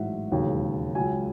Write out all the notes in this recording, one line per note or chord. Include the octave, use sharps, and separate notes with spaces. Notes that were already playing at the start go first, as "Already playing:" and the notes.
Already playing: A1 G#2 F#3 E5 F#5
E1 D#2 C#3 F#3
C#2 C#3 F#3 G#5